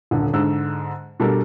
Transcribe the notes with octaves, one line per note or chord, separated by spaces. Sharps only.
D#1 D3
G#2 D3 E6
B2 G3 D4 A4 A#4